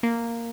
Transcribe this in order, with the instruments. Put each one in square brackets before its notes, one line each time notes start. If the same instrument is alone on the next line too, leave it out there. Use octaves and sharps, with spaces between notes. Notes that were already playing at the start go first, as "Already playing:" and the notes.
[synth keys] A#3